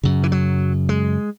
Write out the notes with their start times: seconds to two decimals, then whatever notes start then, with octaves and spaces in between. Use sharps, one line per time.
0.03 F#2 C#3
0.23 E3
0.32 F#3
0.89 G#3